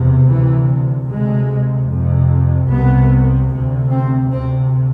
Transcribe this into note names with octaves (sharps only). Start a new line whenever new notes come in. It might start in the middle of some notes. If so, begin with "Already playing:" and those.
Already playing: E2 C3
D2 C3 E3
D2 C3 G#3
F2 C3
C2 C3 B3
D2 C3
C4
D2 C3 C4